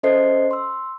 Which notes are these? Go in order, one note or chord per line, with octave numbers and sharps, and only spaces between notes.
C#4 A4 C5 D#5 E5 C7
C6 E6